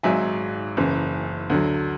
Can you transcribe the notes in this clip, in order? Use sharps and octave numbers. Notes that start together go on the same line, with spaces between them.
G#1 G#2 F#3 E5 G#5
F#1 F#2 E3
D2 D3 F#3